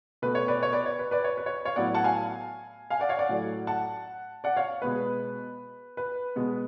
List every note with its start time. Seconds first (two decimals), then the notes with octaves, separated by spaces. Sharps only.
0.22 B2 A3 B4
0.35 C#5
0.48 B4 D5
0.63 C#5
0.73 B4 D5
0.86 C#5
0.99 B4
1.11 B4 D5
1.24 C#5
1.37 B4
1.46 C#5
1.65 C#5 F5
1.76 A2 F#3 B3 D5 F#5
1.94 F#5 A5
2.04 F5 G#5
2.90 F5 G#5
3.00 D5 F#5
3.09 C#5 F5
3.19 D5 F#5
3.29 A2 F#3 A3
3.67 F#5 A5
4.44 D5 F#5
4.57 C#5 F5
4.82 B2 G#3 B3 B4
5.97 B4
6.36 B2 G#3 B3